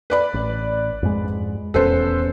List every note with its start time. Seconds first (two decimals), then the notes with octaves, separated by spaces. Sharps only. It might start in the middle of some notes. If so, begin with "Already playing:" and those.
0.10 B4 D5 B5
0.34 A1
1.03 F2 G#2 G#3
1.74 D#1 E2 C#4 A4 B4 C5